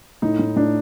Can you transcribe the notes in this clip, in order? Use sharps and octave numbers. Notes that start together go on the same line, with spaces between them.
A2 D#4
A2
A2 D4